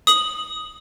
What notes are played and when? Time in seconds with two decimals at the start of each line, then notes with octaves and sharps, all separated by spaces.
0.07 D#6 F#7